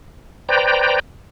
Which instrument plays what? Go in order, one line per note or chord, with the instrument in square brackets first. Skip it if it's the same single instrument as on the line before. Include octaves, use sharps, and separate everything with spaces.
[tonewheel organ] B4 C5 D5 G5 A#5